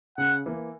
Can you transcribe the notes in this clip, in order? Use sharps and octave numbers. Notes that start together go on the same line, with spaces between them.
C#3 F#5
E3 A#3